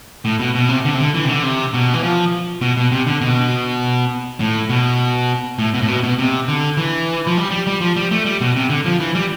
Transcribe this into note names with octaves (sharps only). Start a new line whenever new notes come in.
A2
B2
B2
C3
D3
C3
D3
E3
C3
D3
C3
B2
E3
F3
B2
B2
C3
D3
B2
A2
B2
A2
B2
A2
B2
B2
C3
D3
E3
F3
G3
G3
G3
F3
G3
A3
G3
B2
C3
D3
F3
E3
G3